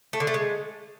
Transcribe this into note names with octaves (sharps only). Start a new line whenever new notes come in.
A3
D3
A3
G#3